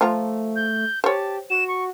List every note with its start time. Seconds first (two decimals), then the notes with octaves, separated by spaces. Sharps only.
0.01 F3 A3 F4 A#5
0.55 G6
1.04 G4 C5 C#5 A5
1.50 F#4 E7
1.68 C#6